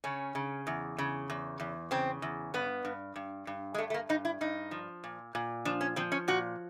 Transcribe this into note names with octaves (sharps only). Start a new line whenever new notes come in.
C#3 C#4
C#3
E2
C#3
E2
E2
C#3 C4
E2
G2 B3
G2
G2
G2
G#3
G2 A3
A3
A#3
G2 D#4
E4
G2 D#4
F3
A#2
A#2
F3 D4
C#4
F3 C4
C#4
A#2 F#4